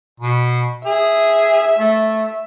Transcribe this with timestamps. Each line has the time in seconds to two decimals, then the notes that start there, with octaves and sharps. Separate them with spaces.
0.20 B2
0.86 G#4 E5
1.79 A3